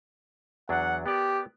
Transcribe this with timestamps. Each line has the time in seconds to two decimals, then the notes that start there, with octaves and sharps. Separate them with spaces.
0.69 E2 F#3 D4 F#5
1.06 B3 G4 A#4 D5